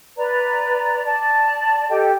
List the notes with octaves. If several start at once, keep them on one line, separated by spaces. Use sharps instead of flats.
B4 D5 A#5
D5 A5
G4 A4 D#5 G5